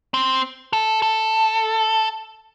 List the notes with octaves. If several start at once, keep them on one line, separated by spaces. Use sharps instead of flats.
C4
A4
A4